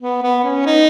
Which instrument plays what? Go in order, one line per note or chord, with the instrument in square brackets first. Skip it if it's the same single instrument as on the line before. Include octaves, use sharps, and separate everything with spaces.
[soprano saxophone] B3
B3
C#4
D#4